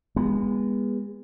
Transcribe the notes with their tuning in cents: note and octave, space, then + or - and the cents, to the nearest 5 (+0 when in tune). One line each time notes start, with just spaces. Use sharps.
G#3 -30 B3 -15